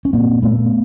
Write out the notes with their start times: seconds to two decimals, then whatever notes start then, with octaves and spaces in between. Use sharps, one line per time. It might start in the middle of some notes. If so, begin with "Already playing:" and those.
0.05 C#4
0.13 A#2 A#3 C4
0.42 A#2 A3 B3